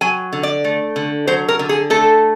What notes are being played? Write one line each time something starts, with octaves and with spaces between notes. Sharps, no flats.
F#3 G#5
D3
D5
A3
D3
F#3 C5
A#4
D3
G#4
A3 A4